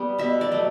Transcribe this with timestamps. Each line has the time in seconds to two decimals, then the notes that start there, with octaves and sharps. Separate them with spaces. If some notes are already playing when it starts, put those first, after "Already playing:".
Already playing: G3 B3
0.19 B2 E5
0.41 D5
0.52 F#3 A3